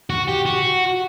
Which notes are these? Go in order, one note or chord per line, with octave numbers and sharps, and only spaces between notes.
F#4
G4
F#4